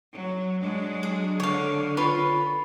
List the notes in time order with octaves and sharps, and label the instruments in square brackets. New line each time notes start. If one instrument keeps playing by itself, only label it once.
[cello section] F#3
F#3 G#3 D4
[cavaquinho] G#4
[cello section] D3 [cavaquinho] C#5 F5
[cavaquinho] F4 B4 C#5